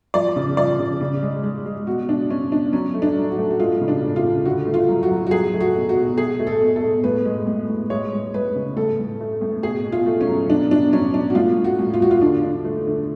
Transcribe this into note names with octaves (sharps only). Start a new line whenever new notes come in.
F3 D5
C#3
F3 D5
C#3
C#3
G#3
G#3
G#3
B2 F#4
B2 D4
B2 C#4
B2 D4
F#3 C#4
A3
D4
F#3
F#4
A3
F#4
G#3 F4
C#3
D4
C#3
F4
C#3
D3 F#4
A3
F4
F#3
F#4
F#3
F#4
F#3 G#4
A3
F#4
B2
F#4
B2
B2 G#4
A3
A4
B2
A4
B2
A2 B4
G#3
A2
A2
G#3 C#5
G#3
G#3 B4
C#3
A2 A4
A2
A3
A2
B2 G#4
B2
F4
A3
C#4
F#3
B2 D4
B2 D4
F#3 C#4
B2 D4
F#4
A2 F4
A2
F#4
A2
F4
A2 F#4
F4
D3 D4
D3
A3
D3